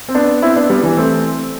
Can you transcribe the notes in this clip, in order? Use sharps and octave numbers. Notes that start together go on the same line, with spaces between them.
C4
B3 D4
C4 E4
B3 D4
G3 B3
E3 G3
A3 C4